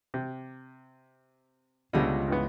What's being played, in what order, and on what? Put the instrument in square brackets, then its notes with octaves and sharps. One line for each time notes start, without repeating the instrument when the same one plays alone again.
[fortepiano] C3
[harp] C#2 D#5 [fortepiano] B2 D3 G3
[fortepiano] G2 E3 B3